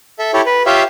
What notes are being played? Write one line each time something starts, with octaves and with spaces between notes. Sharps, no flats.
A4 E5
E4 G4 A4 C#5
B4
F4 G4 C#5 E5 F5